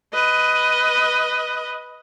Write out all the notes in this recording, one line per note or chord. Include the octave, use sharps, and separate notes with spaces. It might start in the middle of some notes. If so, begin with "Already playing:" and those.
B4 D#5